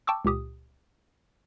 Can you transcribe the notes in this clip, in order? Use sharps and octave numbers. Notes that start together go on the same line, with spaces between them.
G5 A5 C#6 D6 E6
C#2 A#2 G4 D#6